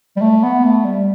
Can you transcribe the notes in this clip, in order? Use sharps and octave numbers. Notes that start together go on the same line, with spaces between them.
G3
A3
B3
A3
G3